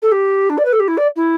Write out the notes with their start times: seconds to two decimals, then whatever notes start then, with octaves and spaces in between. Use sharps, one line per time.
0.02 A4
0.11 G4
0.49 D4
0.57 D5
0.65 B4
0.72 A4
0.79 G4
0.88 E4
0.97 D5
1.16 E4